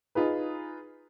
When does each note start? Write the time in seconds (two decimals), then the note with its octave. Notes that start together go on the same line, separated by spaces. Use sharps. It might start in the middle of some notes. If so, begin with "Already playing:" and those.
0.15 D#4 F4 G#4 B4